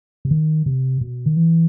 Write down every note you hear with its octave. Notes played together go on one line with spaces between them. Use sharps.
C3
D#3
C3
B2
D#3
E3